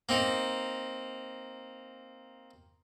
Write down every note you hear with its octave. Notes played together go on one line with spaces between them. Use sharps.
A#3 C4 D#4